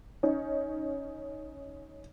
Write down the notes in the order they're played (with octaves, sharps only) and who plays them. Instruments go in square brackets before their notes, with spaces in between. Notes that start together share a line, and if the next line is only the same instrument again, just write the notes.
[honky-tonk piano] C#4 D#4